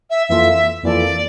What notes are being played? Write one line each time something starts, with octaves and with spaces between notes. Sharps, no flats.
E5
F2 E3 A#3 F4 A4 E5
F2 E3 A#3 F4 A4 D5